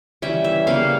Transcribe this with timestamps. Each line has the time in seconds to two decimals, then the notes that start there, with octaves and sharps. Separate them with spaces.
0.22 E3 G3 C#4 E5
0.44 E5
0.67 C#3 G3 A#3 C#4 F5